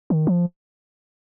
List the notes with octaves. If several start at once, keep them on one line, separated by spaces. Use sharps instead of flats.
D#3
F3